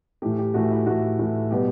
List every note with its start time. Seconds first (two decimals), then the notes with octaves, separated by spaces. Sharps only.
0.22 A2 E3 A3 G4
0.39 G4
0.54 A2 E3 A3 F#4
0.71 E4
0.86 A2 E3 A3 F#4
1.19 A2 E3 A3
1.51 B2 G3 B3 G4